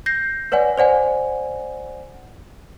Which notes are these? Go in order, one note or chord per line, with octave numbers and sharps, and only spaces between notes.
G6 A#6 C7
B4 C#5 D5 F#5 G#5
C5 D5 F#5 G#5